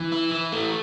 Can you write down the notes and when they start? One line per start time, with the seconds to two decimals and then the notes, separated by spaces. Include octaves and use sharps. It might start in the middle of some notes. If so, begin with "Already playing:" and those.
Already playing: E3
0.12 E4
0.31 E3
0.52 A3